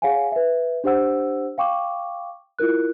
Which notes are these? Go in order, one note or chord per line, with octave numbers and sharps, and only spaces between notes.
G#4 C#5 F5 F#5 G#5
B4 E5
D4 G4 C5 F#5 E6
F5 G5 C#6 D6
E4 F4 A#4 F#6